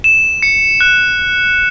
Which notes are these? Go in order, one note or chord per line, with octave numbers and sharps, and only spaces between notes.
E7
C#7
F#6